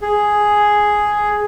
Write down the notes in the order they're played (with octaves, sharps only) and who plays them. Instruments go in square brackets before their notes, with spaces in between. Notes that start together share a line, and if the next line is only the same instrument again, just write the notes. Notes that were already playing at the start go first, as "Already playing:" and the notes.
[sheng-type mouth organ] G#4